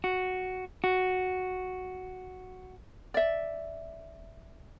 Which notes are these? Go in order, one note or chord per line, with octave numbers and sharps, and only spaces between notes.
F#4
F#4
D5 E5